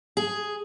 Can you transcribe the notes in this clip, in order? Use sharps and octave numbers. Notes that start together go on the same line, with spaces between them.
G#4